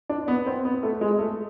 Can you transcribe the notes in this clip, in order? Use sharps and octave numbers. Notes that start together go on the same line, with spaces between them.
D4
B3
C4
B3
A3
G#3
A3